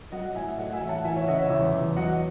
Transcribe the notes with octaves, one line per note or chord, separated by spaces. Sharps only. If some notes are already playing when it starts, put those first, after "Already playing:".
F#3 D#5 F#5
A2 E5 G#5
A3 D#5 F#5
E5 G#5
A1
F#5 A5
E3 E5 G#5
C#5 E5
C#3 D#5 F#5
C#5 E5
E2
E2
F#3 D#5 F#5